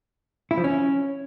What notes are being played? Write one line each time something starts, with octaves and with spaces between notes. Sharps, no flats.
E4
F3
C#4